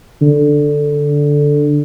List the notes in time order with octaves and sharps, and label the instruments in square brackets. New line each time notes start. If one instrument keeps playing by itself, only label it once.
[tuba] D3